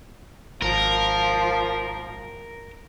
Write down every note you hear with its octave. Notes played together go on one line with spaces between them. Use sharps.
G#1 F3 A#4